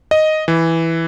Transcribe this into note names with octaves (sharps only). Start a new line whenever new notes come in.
D#5
E3